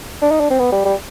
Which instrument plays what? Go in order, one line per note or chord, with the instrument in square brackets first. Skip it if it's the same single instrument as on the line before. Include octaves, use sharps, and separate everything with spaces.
[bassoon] D4
D#4
D4
C4
B3
G3
G3